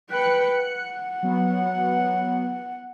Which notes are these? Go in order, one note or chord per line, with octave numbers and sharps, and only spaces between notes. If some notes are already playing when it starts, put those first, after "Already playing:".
B4 G5 F#6 C#7
F#5
F#3 B3